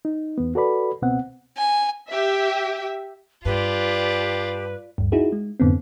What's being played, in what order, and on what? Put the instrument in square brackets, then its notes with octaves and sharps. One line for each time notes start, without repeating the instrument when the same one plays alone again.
[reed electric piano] D#4
E2 B3
F#4 A4 B4 D5 B5
C#2 B2 B3 C4 F#5
[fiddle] G#5
[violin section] G4 E5
[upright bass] G2 [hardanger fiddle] F4 D5 [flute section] G4 A5 [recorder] B4
[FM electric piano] D2 G2
D#4 E4 F#4 G#4
G#3
F2 G#2 D3 B3 C4